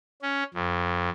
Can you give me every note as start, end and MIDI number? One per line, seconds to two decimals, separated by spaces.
0.22 0.43 61
0.54 1.09 41